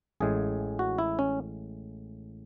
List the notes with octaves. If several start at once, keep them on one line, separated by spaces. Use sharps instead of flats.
A1 A2 G#3 G#4
F#4
E4
C#4